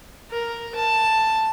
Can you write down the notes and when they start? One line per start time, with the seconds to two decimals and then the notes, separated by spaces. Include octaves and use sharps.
0.30 A#4
0.75 A5